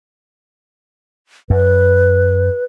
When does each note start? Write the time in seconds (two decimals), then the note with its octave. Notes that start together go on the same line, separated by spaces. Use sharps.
1.50 F#2 B4